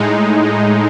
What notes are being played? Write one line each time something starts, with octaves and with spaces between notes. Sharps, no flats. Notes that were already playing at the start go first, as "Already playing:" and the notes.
Already playing: A2 G#3 D#4